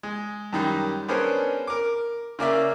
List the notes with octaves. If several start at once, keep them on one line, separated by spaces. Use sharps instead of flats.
G#3
F#2 D#3 G3
B3 C#4 D4 G#4 A#4 C5
A#4 D6
C#3 A#3 D5 E5